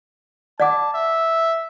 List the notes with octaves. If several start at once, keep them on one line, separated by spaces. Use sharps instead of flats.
D5 F#5 A5 D6
E5